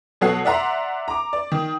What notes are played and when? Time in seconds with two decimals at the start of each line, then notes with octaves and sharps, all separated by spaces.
0.21 B2 F#3 A4 C#5 F#5 C7
0.45 D5 E5 F#5 A#5 C6
1.08 A#5 D6
1.33 D5
1.52 D#3